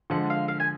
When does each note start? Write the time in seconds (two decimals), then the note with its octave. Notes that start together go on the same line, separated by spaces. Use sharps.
0.10 D3 F3 G#3 F#5
0.30 F5
0.48 F5
0.60 G#5